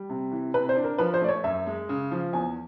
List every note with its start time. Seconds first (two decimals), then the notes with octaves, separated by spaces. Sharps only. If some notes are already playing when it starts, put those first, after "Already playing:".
Already playing: G3
0.09 C3
0.31 E3
0.54 C3 B4
0.69 C5
0.76 D4
0.84 A#4
0.98 F3 B4
1.14 C5
1.22 A3 D5
1.29 C#5
1.44 F#2 E5
1.67 G#3
1.89 C#3
2.11 F3
2.33 E2 G#5